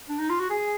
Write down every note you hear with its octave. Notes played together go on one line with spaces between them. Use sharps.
D4
D#4
F4
F#4
G#4 G#5